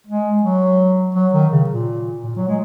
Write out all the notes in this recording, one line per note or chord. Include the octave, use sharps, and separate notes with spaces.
G#3
F#3
F#3
D#3
C#3
A#2
A#2
F#3
G#3